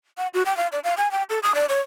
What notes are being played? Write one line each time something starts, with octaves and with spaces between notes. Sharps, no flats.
F#5
F#4
G5
F5
D5
F5
G#5
G5
A4
D#6
D5
C#5